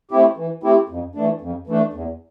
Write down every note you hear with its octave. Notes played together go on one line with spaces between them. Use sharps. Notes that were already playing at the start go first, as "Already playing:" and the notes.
A3 C4 E4 G4
E3
A3 C4 E4 G4
F2
E3 A3 D4
F2
E3 A3 D4
E2